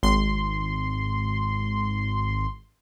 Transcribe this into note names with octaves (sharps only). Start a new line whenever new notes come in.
G#1 C6